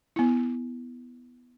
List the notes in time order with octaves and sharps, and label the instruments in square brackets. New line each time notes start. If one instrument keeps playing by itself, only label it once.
[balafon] B3 E4